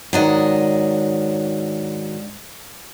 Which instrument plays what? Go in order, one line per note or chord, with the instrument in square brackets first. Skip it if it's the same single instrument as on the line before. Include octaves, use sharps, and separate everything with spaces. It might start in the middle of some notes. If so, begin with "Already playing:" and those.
[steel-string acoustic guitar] G#2 D4 D#5 [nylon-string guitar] D#3 F#3